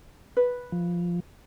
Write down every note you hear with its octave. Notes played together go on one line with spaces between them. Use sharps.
B4
F3